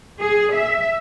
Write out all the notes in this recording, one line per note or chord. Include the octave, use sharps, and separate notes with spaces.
G#4
E5